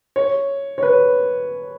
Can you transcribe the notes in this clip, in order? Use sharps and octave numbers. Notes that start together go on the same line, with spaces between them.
C#5
C#5
B4